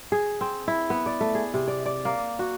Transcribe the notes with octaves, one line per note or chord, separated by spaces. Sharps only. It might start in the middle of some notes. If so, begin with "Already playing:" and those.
G#4
C4
E4
B3
D5
A3
G#4
C3
D5
D5
A#3
F#4